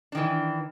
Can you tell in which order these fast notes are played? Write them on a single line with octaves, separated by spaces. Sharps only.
D4 D#3 E3